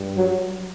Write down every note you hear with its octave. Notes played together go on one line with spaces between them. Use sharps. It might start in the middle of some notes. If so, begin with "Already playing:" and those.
Already playing: G2
F#3